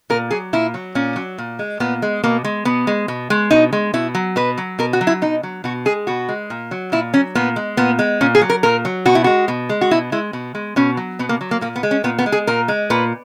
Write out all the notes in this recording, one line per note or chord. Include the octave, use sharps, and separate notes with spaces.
A#2 A#4
F#3 G#4
A#2 E4
F#3
A#2 C#4
F#3
A#2
G#3
A#2 B3
G#3
B2 A#3
G#3
B2 B3
G#3
B2
G#3
B2 D#4
G#3
B2 E4
F#3
B2 B4
F#3
B2 A#4
F#4
F#3
E4
B2 D#4
F#3
B2 F#4
G#3 G#4
B2 F#4
G#3
A#2
F#3
A#2 E4
F#3 C#4
A#2 B3
G#3
A#2 B3
G#3
A#2 C#4
G#4
F#3
A#4
A#2 A#4
F#3
B2 F#4
E4
G#3 F#4
B2
G#3
F#4
B2 E4
G#3 E4
B2
G#3
B2 C#4
F#3
B2 B3
A#3
F#3
A#3
A#2 A#3
B3
G#3
C#4
A#2 B3
B3
G#3
G#4
A#2 A#4
G#3
A#2 B4